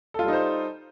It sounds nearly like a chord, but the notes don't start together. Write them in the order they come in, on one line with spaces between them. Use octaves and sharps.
A4 F4 G3 D#4 C5